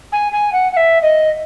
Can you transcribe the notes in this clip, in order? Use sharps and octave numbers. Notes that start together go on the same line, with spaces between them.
G#5
G#5
F#5
F#5
E5
D#5